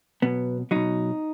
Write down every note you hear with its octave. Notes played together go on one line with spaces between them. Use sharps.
B2 F#3 B3
B2 F#3 D#4